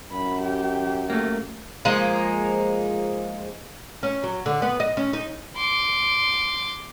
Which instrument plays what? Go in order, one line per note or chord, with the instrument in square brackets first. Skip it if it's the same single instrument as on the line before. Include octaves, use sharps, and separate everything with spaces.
[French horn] F#2 [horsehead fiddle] B5
[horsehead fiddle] G4
[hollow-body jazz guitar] A3 A#3
[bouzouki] F3 G#3 A#3 D#4
[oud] C#4
F#3
D3
B3
D#5
C#4
D#4
[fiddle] C6 D6